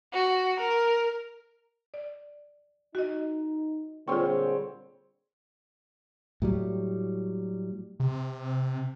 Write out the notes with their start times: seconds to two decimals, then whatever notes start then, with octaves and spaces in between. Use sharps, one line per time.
0.13 F#4
0.60 A#4
1.94 D5
2.95 D#4 F#4 D#5
4.08 A#2 D3 G3 C4 F4 G#4 C#5 G5
6.42 A2 F#3 G3
8.00 C3